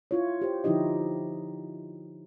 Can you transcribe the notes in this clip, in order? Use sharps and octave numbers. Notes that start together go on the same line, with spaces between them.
E4 F4 C#5
G4 C5
D3 F3 D#4 E4 G4 D#5